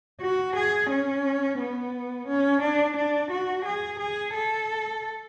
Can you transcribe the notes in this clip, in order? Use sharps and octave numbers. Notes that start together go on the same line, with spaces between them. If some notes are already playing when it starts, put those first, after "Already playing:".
F#4
G#4
C#4
B3
C#4
D4
D4
F#4
G#4
G#4
A4